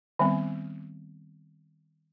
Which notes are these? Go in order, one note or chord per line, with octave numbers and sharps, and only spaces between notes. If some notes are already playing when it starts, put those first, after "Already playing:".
D#3 G3 B3 C4